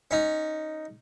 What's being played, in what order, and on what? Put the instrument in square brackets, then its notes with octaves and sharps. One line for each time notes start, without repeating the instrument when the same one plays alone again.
[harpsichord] C#4 D#4